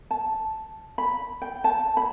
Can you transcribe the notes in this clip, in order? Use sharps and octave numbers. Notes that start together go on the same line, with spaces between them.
A5
B5
G5
A5
B5